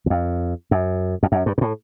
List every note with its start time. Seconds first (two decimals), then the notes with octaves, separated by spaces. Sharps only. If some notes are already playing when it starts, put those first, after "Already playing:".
0.06 E2
0.10 F2
0.71 F#2
1.23 F2
1.32 F#2
1.46 G2
1.58 G#2
1.61 A2